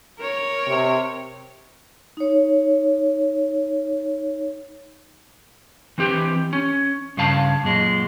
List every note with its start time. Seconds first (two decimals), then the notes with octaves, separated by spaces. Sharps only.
0.18 A#4 C#5
0.67 C3
2.17 D#4 C#5
5.98 E3 C4 G4
6.53 C#4
7.17 G2 C#3 F5 A5
7.64 F#2 A#2 G#3